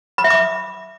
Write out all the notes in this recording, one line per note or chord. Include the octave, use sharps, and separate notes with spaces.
B5
E5
D6